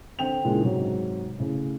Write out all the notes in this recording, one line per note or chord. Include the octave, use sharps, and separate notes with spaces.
D3 C4 G5 F7
A#2 C#3 E3 G#3
G#2 C3 F#3
A2 C#3